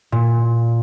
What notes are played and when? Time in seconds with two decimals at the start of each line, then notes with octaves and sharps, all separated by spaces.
0.12 A#2